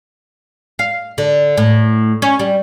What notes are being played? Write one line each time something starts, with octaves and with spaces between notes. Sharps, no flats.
F5
D3
A2
C#4
G3